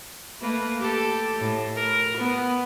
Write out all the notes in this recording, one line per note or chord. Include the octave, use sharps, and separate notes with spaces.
A3 A#3 B4
G4 A4
A2
A#4
B3